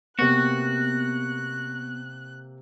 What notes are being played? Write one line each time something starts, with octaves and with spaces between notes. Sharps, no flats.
C3 A#3 B3 F#4 F#6 F#7